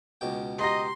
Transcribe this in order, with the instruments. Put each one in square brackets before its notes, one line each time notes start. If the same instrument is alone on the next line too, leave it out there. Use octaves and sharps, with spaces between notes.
[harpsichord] C#2 B2 G5
[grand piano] G4 A#5 A#6 [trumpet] D#5 [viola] C6